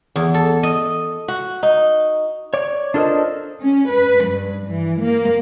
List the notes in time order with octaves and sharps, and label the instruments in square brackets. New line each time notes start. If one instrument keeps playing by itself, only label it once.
[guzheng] E2
A4
D#5
[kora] F#4
D#4
[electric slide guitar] C#5 D5
D4 F4 A4 A#4 C5 D#5
[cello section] C#4
B4
G2
E3
A#3